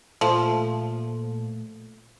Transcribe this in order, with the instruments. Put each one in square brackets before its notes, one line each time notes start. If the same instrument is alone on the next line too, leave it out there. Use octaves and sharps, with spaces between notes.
[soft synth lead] A#2 [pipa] F3 [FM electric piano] A3